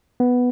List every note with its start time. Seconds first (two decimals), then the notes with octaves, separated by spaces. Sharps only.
0.20 B3